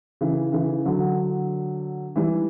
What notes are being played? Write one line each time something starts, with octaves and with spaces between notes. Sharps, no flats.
C#3 E3
C#3 E3
D3 F#3
E3 G3